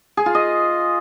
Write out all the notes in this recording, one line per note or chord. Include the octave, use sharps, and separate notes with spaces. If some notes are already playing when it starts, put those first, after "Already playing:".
G#4
F4
D#5